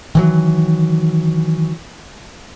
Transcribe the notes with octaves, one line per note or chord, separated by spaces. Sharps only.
D#3 E3 F#3